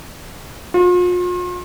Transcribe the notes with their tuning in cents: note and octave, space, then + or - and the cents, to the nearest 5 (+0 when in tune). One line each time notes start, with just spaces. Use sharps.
F4 +40